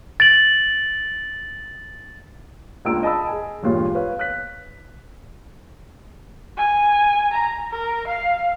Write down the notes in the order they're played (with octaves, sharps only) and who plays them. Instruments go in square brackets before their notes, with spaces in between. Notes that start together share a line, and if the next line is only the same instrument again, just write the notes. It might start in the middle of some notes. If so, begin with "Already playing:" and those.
[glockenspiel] A6 D7 F#7
[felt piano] C#2 A#3 D4 F4 E6 D7
D#5 A5 B5 E6
G#4 G#5
E1 G2 A#2 F4 C#5
B4 C#5 F5
F#6 B6
[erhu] G#5
A#5
A#4
F5